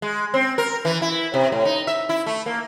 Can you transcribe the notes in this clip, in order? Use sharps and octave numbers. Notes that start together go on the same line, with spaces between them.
G#3
C4
A#4
E3
E4
C3
A2
D#4
E5
E4
A3
A#3